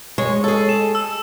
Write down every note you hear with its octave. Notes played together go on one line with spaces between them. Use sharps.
G#3 C#5
G#4 A4
E7
E6